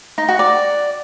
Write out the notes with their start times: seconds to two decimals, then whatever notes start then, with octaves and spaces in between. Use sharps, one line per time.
0.18 D#4
0.28 F#4
0.39 D5